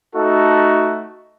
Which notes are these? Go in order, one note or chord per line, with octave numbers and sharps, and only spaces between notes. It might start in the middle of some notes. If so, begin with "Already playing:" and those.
A3 D#4 F#4 A4